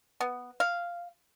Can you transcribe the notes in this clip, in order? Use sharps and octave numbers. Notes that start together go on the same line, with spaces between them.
B3
F5